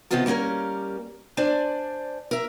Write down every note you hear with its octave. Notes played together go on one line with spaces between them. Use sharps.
C3 D#3 E3 B3 F4 A4
G3 A#3 C4 C#4 A#4
D4 C5 D5 G#5
A#4 E5